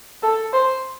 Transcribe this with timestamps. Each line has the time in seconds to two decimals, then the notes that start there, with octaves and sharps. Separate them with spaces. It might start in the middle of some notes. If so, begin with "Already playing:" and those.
0.23 A4
0.53 C5